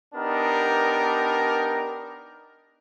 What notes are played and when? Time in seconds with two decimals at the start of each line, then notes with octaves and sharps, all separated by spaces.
0.15 B3 D4 D#4 G4 A#4